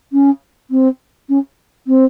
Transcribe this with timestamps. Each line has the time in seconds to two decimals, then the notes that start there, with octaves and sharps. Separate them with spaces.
0.13 C#4
0.71 C4
1.29 C#4
1.87 C4